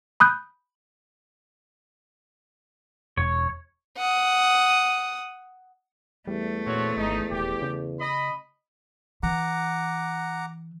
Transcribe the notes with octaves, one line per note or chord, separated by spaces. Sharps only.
B5 D#6 F#6 G6
E1 C#5
F#5 D#6
E2 G3 A3
A#2 C4 F#4 C#5
G#1 D#4
D#1 G4
C#3
D#5 B5
E3 F#5 A#5 D6